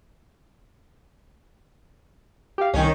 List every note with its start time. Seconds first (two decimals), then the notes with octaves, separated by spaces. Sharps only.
2.58 G4 F5
2.74 C2 D#3 C#4